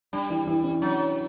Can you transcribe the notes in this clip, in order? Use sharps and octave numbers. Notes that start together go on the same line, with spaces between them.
G3 D4
E3 E4
E3 E4
C#4
F#3 D4